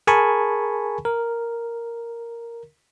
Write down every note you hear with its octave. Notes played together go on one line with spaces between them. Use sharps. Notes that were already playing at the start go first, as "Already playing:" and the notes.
G#4 A#4 G#5 A5 B5 C#6
A#4